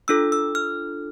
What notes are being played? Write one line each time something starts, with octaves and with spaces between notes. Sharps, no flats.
D4 F4 A4 E6
E6
F6